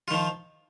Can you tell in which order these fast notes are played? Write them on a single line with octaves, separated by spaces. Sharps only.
F4 D#3 F3